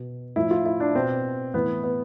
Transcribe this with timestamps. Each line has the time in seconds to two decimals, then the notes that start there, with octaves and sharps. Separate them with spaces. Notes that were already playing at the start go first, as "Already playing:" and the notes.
Already playing: B2
0.36 A2 F3 E4
0.51 F4
0.66 E4
0.80 D4
0.95 B2 C4
1.54 A2 E3 B3
1.84 B3